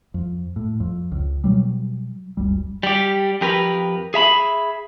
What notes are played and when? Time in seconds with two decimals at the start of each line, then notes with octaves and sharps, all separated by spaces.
0.14 F2
0.56 A2
0.80 F2
1.12 C#2
1.44 B2 F#3 G3
2.37 F#1 C#2 G3
2.83 G3 G4
3.41 F2 G4 A#4 B4
4.14 G#4 E5 A#5 B5